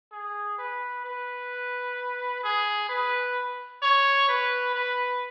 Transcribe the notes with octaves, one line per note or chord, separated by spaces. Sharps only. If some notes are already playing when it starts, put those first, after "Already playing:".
G#4
B4
B4
G#4
B4
C#5
B4
B4